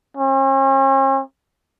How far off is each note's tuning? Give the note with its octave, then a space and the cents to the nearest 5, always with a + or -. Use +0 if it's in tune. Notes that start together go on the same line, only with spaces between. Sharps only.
C#4 -45